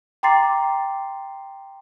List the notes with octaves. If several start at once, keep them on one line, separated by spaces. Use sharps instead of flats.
G5 A#5 C6 D6 A6 C7